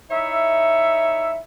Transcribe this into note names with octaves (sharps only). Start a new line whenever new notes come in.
D#4 E4 C#5 E5